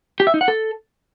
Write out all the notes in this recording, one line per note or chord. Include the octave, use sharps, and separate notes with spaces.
G4
E5
D#4
F#5
A4